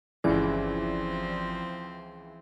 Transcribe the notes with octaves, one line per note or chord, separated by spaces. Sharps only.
G1 C#2 E3 F3 C4 D5